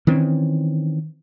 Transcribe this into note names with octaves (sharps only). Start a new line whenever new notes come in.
D#3 E3 C4 C#4